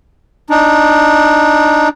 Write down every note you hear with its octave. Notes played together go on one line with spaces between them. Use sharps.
D4 D#4